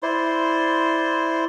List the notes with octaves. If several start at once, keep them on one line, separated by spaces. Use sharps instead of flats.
E4 C5 D5 C6